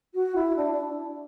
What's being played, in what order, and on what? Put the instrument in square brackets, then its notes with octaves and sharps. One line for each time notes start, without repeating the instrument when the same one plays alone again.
[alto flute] F#4
E4
D4
D4